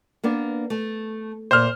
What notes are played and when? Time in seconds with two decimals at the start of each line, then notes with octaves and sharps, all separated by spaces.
0.24 A#3 B3 D4
0.70 A3
1.51 A#2 C5 E5 F6